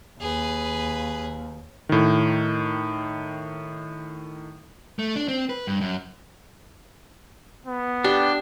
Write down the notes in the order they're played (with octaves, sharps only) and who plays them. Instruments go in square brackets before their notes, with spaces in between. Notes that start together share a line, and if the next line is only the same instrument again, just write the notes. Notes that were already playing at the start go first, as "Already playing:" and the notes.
[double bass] D#2 [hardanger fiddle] G#4 B4
[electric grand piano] A2 D#3
[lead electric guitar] A3
D4
C4
B4
G2
F#2
[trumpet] B3
[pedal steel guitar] D4 [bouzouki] G4